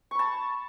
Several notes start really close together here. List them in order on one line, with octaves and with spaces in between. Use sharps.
C#6 B5 A5